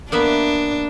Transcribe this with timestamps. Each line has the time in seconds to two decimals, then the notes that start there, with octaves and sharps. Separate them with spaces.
0.12 A#3 B3 D4 E5